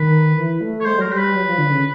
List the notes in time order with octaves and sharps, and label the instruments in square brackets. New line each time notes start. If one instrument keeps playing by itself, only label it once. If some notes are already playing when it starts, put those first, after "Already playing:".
Already playing: [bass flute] D#3 [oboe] B4
[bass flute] E3
A3
[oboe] C#5
[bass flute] G#3 [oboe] C5
[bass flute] F#3 [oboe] A#4
[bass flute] G3 [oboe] C5
[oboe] B4
[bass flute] F#3
F3
D3
C#3